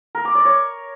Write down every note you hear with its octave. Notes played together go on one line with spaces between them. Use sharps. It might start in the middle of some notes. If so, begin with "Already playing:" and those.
A#4
D6
D5
C#5